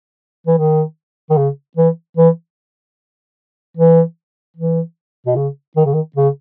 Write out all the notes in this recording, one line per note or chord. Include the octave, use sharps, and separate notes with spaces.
E3
D#3
D#3
C#3
E3
E3
E3
E3
B2
C#3
D#3
C#3
D#3
C#3